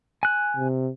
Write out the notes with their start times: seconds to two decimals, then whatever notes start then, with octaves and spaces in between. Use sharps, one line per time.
0.23 G#5 F#6
0.57 C3